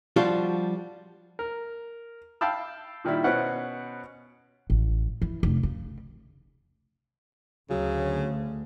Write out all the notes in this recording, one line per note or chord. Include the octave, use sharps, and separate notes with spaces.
F3 G3 D4 F4 F#4
A#4
F5 G5 A5 B5 E6
A#2 D#3 G3 E4
B2 C#4 B4 C5 F#5 F#6
A1
E3
F1
C#3
D2 C#3 F#3